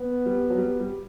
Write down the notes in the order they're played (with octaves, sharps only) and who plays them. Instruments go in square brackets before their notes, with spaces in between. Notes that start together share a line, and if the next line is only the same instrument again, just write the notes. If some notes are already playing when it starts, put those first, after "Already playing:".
Already playing: [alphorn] B3
[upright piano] G3
F#3
G3
G3